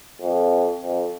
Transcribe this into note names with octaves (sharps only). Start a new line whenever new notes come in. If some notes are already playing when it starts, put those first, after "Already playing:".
F2
F2